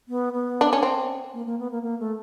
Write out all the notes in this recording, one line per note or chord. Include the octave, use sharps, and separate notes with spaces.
B3
B3
D4
C#4
C4
A#3
A#3
B3
A#3
A#3
A3